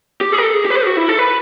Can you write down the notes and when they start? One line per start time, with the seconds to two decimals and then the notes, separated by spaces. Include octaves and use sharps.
0.21 G4
0.32 G#4
0.38 A#4
0.43 A4
0.53 G#4
0.65 G4
0.70 B4
0.75 C5
0.86 F#4
0.97 E4
1.09 A4
1.19 B4